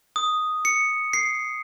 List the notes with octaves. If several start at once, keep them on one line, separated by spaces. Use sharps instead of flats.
D#6
C#7
C7